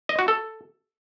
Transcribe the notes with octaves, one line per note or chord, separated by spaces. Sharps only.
D#5
F#4
A4